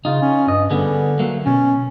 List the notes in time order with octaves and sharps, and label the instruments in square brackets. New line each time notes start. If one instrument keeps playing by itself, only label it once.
[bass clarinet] C#3 [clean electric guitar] D#4 F4
[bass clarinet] C#4
[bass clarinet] G2 [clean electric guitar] D#5
[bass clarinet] D3 [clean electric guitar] G3 B3 G#4
[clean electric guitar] F#3 A3 A#3
[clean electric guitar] B2 [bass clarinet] C#4